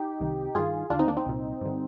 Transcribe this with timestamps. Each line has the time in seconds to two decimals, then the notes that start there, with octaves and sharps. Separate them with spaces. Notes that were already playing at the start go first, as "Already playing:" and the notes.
Already playing: D#4 G4
0.20 C2 C3 D#3
0.55 G2 D#3 F4 G#4
0.90 D#2 D3 D4 F4
0.99 C4 D#4
1.08 A#3 D4
1.17 C4 D#4
1.26 C2 A#2
1.61 G2 D3